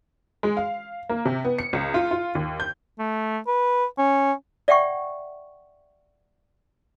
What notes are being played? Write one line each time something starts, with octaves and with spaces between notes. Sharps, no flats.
G#3
F5
A#3
C3
B3
C#7
C#2
F4
F4
D#2
G6
A3
B4
C#4
D5 E5 F#5 G5 C#6